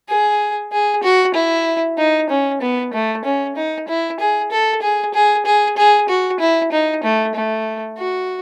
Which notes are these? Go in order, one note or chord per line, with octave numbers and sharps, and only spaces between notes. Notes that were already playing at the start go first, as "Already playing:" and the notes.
G#4
G#4
F#4
E4
D#4
C#4
B3
A3
C#4
D#4
E4
G#4
A4
G#4
G#4
G#4
G#4
F#4
E4
D#4
A3
A3
F#4